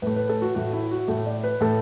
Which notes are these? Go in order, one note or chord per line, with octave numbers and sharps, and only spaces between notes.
A2 A3 B4
B4
A4
F#4
A2 A3 F#4
E4
F#4
A2 A3 A4
D5
B4
A2 A3 A4